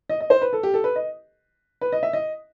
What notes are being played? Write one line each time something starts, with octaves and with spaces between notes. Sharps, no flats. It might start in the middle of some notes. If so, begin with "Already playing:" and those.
D#5
D#5
C5
B4
A4
G4
A4
B4
D#5
B4
D#5
E5
D#5